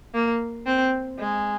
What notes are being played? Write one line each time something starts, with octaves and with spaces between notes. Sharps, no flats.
A#3
C4
G#3